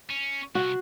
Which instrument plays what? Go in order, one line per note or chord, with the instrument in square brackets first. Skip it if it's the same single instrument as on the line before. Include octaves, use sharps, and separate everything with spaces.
[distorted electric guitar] C#4
[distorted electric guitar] C2 [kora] F#4